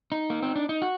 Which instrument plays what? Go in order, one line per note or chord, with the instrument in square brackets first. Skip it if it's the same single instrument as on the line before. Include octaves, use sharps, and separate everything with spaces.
[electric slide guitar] D#4
A#3
C4
D4
D#4
F#4